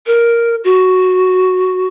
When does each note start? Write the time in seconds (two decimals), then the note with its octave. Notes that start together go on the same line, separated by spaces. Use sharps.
0.06 A#4
0.64 F#4